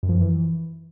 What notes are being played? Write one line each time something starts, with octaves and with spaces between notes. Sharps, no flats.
F#2
F3
F#2
E3